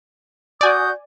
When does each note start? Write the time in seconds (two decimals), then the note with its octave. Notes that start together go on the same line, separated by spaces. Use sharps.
0.61 F#4 D5 G#5 D#6 G6